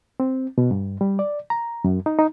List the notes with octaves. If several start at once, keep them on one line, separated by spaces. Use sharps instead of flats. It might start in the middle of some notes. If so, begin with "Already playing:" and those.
C4
B2
G2
G3
D5
A#5
F#2
D#4
D#4